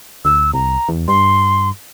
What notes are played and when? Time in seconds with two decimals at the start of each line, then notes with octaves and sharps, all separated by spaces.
0.25 D2 E6
0.54 C2 A#5
0.89 E2
1.08 G2 C6